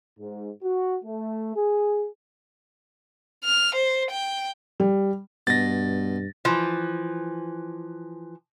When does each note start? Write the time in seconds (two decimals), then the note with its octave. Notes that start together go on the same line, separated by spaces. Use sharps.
0.20 G#2
0.64 F#4
1.04 A3
1.57 G#4
3.44 F6
3.75 C5
4.11 G5
4.80 G3
5.47 G2 B2 A6 A#6
6.45 E3 F3